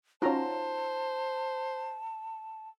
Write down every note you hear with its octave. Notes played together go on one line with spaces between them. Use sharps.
C#4 D#4 F4 F#4 C5 A5 A#5